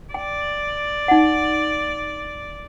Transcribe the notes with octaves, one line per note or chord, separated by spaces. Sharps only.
D5 G5
D#4 F#5